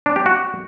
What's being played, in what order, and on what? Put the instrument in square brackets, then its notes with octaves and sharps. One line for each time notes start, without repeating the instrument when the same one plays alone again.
[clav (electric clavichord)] D4
G4
F#4